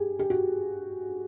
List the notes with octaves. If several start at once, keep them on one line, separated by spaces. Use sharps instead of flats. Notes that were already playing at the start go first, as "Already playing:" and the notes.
Already playing: G4 G#4
G4
F#4